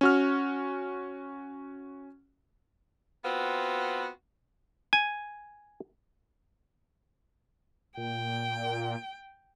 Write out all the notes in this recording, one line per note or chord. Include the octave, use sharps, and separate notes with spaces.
C#4 F#4 F6
B3 C4 F4 F#4 B4
G#5
A#2 G5